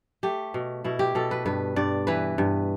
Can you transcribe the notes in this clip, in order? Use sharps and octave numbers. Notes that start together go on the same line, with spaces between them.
A3 G4
B2
B2 E4
G4
B2 A4
B4
G2 B4
G2 D5
E3 B4
G2